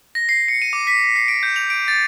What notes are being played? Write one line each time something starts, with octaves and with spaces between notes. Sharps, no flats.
A#6
C7
C#7
D#7
D6
B6
C7
D7
G6
F7
D7
A6